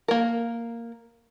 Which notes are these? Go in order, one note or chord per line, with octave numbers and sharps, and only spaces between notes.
A#3 A#4